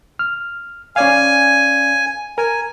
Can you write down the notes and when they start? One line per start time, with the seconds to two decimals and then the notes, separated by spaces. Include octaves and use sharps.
0.19 F6
0.96 C#4 D5 F5 G#5
2.38 A#4 G#5